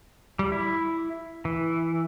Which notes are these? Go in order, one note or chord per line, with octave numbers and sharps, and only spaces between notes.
G3
E4
E3